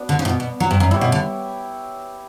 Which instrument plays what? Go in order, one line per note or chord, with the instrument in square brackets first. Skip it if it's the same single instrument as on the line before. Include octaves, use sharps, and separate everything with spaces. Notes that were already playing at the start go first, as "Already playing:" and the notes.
Already playing: [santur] B3 D4 F#4 B4
[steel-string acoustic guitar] D3
C#3
A2
B2
B2
F#3
G2
F#2
[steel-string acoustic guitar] G2 [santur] E4
[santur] G4 C#5
[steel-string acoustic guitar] B2
D3